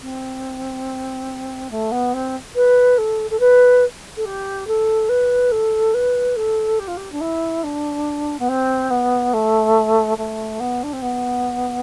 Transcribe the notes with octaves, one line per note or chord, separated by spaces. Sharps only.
C4
A3
B3
C4
B4
A4
A4
B4
A4
G4
A4
B4
A4
B4
A4
G4
F4
G4
D4
E4
D4
B3
C4
B3
A3
A3
B3
D4
C4
B3